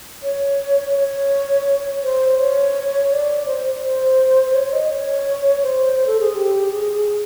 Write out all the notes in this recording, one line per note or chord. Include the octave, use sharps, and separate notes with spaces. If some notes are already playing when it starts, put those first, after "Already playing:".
C#5
C#5
C5
C#5
D5
C5
C5
C5
C#5
D#5
C#5
C5
A4
G#4
G4
G#4